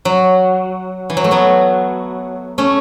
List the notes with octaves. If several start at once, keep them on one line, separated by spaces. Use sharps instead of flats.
F#3
E3
F#3
A3
F#3 B3
A3 C#4